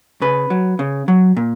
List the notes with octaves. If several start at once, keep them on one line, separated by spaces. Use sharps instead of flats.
C#3 B4
F#3
C#3
F#3
A#2